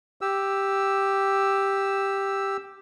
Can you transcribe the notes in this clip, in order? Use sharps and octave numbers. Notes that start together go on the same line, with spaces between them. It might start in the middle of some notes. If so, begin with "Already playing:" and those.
G4 E6